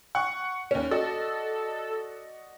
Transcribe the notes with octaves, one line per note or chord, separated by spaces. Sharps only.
F#5 C#6 F#6
D#2 C#4
F#4 A4 D5 D#5